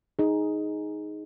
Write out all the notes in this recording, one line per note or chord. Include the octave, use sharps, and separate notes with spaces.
D#4 G#4